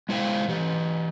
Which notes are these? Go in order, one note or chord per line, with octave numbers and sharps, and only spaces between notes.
G#3 E4 C5 F5 G5
E3 G4